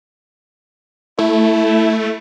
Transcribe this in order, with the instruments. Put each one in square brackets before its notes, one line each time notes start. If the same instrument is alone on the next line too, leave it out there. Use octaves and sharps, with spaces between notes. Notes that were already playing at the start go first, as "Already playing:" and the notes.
[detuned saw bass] A3 [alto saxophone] E4